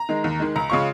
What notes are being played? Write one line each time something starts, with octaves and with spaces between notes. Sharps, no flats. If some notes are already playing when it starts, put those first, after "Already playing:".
Already playing: A#5
D#3 G#3
D#2
D#3 G#3
C#2 A#5
C#3 G#3 C#4 F4 C#6